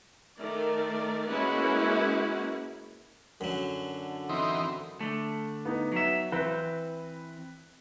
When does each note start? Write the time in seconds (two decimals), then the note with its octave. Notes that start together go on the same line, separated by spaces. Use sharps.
0.38 D#3 A3 A#4 D5
1.27 G#3 A#3 C#4 E4 F#4 B4
3.41 F#2 D3 F#3
4.29 E3 C4 D#4
5.00 D3 A3
5.65 B3 D#4
5.92 F#3 E5
6.32 E3 C4 B4